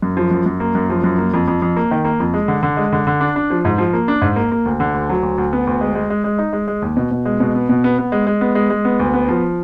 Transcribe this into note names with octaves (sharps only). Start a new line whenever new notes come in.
F#2
F3
F#2
F#2
A#3
F#2
F3
F#2
A#3
F2
F2
F2
A#3
D#3
A#3
F2
G#3
D3
D3
G#3
D3
D3
D4
D4
F3
G#2
F3
A#3
D4
G#2
A#3
A#3
D2
D3
D2
F#3
D2
D2
B3
D2
G#3
G#3
G#3
G#3
D#4
G#3
G#3
D#2
B2
B2
G#3
B2
B3
B2
B3
B3
G#3
G#3
B3
G#3
G#3
B3
D2
B3
F3